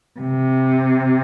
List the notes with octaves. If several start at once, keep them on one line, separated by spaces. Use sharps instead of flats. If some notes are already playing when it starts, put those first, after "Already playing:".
C3